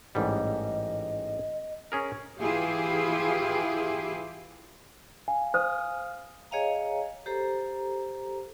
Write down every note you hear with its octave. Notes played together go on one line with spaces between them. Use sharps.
A1 G#2 G3 D#5
C#4 G#4 A#4
E3 E4 F4 G4 G#4
F5 G#5
C5 F5 D#6 F6
G#4 C#5 D#5 F5 G#5 A#5
G4 A4 C5 A#5